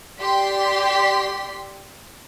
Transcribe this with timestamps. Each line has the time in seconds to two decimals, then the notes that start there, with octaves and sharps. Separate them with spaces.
0.21 G4 D5 G5 C6 B6